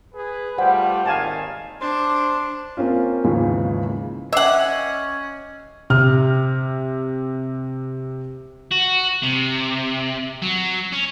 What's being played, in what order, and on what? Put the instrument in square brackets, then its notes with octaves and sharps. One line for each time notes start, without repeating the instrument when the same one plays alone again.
[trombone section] G#4 B4
[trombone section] G3 A3 F4 [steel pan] C5 [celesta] F#5
[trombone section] G#1 D#2 D#3 [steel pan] F5 G#5 A5
[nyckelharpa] D4 [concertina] C5 C6
[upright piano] A#3 C4 C#4 F4
D#2 G#2 C#3 E3 F3
[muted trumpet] C#4 [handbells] D#5 D6 C7 [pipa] E5 F#5
[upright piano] C3 F6
[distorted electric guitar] F#4
C3
F#3
C#4